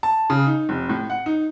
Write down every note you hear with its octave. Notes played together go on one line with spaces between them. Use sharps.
A5
C#3
D#4
F1
A2
F#5
D#4